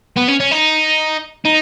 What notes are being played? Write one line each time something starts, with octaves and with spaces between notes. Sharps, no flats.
B3
C#4
C#4
D#4
D#4